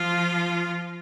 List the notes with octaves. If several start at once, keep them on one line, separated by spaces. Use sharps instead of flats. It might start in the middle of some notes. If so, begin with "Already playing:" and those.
Already playing: F3 F4